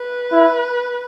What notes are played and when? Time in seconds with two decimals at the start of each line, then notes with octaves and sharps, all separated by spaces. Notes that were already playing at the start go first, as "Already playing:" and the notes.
Already playing: B4
0.32 E4